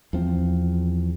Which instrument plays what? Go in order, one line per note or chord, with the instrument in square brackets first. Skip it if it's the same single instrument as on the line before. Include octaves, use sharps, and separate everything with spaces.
[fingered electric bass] E2 F3 C4